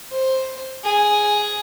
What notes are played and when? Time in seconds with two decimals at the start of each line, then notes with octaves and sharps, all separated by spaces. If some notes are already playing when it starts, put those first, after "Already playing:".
0.12 C5
0.84 G#4